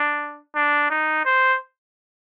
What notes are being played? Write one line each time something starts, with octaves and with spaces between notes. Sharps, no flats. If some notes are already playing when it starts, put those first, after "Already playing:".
Already playing: D4
D4
D#4
C5